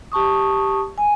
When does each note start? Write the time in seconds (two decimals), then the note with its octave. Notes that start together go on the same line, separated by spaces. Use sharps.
0.12 G4 A5 C#6 D#6
0.98 G#5